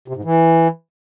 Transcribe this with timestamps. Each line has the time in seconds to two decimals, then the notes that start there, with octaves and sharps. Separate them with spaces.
0.08 C3
0.16 G#2
0.24 E3